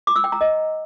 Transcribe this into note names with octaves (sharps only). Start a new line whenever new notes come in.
D6
E6
G5
A#5
D#5